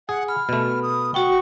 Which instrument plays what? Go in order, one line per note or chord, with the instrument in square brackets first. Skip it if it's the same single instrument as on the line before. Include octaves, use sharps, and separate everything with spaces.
[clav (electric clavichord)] G#4 [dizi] F#5
[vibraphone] B5 [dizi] F6
[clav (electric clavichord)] B2 A3
[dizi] D#6
[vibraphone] F#4 F#5 G5 [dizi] C#6